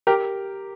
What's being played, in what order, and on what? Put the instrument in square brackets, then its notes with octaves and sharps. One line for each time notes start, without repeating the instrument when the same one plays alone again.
[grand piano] G4 A#4